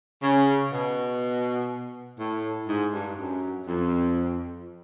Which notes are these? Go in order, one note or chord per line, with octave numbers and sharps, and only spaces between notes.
C#3
B2
A2
G#2
G2
F#2
F2